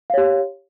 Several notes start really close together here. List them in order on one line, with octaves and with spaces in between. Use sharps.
F5 C#5 G4